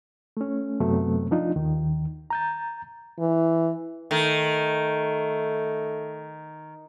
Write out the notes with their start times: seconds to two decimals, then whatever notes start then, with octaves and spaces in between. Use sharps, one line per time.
0.37 A3 C#4
0.80 F#2 C3 F#3 A3 B3 C4
1.31 F3 D4 D#4 F4
1.56 D#2 D#3
2.30 A#5 G6 A6
3.19 E3
4.11 D#3 A3